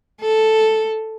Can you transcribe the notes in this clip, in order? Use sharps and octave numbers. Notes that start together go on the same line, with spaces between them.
A4